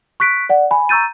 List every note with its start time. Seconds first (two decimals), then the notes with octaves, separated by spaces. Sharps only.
0.20 C#6 F#6 B6 D7
0.49 D5 F#5
0.71 G#5 B5
0.89 A#5 C#6 E6 G6 A6 D#7